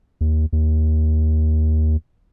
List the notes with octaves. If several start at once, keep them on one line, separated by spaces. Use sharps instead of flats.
D#2
D#2